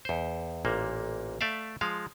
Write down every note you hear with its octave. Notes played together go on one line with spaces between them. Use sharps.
E2 C5
A1 A#2 A#3
A3 D5 E5 F5
F3 G#3 F5